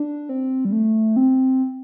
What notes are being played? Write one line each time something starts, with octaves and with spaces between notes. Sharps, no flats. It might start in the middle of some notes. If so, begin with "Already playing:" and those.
Already playing: D4
C4
G3
A3
C4